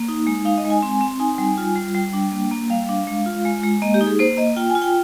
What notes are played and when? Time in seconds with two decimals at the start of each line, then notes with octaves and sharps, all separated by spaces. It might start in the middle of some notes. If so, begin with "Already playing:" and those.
Already playing: A#3
0.09 D#4
0.27 G#3
0.45 D#4 F5
0.58 D#5
0.65 G#3
0.70 G#5
0.83 C4
1.01 C4
1.20 D#4 G#5
1.38 G3
1.58 F4
1.76 G3
1.95 G3 G5
2.13 D4
2.32 A#3
2.51 A#3
2.70 G3 F5
2.89 D4
3.07 G#3
3.26 F4
3.45 G#3
3.63 G#3
3.82 A#3 D#5
3.94 G4
4.01 D#4
4.07 G#4
4.19 A#3 C5
4.37 A#3 D#5
4.56 F4 G5
4.70 G#5
4.75 F4
4.82 G5